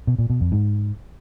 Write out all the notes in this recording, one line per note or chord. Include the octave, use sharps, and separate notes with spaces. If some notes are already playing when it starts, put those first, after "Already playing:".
B2
A#2
B2
F2
G#2